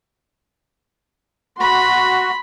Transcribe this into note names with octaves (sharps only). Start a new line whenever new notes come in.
F#4 B5 C6